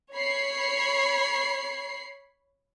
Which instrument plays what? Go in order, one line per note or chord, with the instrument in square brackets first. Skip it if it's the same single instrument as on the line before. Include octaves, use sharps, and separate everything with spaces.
[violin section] C#5 B5 C7